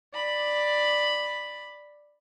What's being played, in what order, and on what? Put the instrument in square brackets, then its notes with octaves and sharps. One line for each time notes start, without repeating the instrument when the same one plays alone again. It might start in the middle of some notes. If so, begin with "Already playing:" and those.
[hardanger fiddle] D5 B5